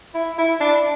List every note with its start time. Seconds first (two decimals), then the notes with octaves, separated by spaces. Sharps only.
0.14 E4
0.38 E4
0.61 D4